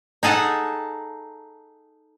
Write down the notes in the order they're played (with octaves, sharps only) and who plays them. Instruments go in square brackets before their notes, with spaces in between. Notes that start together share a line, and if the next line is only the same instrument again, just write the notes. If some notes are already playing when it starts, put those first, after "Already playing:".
[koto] D#4 G#4 A4 F#5